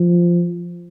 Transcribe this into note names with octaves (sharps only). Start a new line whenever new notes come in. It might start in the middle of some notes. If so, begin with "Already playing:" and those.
Already playing: F3